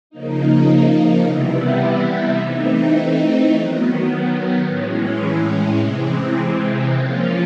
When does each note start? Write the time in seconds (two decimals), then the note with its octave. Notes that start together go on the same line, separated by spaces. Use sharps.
0.10 C#3 F3 A#3 D#4
1.24 C3 E3 G3 B3 E4
2.38 E3 A3 C4 D#4
3.51 D#3 F#3 B3
4.65 A2 E3 G#3 C#4
5.79 C3 E3 G#3 C4
6.92 F3 A#3 C#4 F4